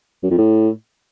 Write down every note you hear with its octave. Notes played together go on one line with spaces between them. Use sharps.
F#2
F2
A2